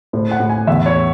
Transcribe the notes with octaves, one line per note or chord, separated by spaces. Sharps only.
A2 C5
F#5
A2
G#5
E2 E5
C#5